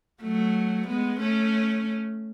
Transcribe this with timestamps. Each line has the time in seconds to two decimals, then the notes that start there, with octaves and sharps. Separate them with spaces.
0.23 F#3 A3
0.88 G#3 B3
1.20 A3 C#4